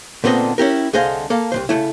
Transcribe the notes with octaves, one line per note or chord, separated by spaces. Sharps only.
A#2 D3 B3 C4 D4 D#5
C#4 E4 G4 A#4
C2 D3 G#4 C5 D#5 F5
A#3 A4 F5
C2 C3 C5
C#3 F3 A3 E4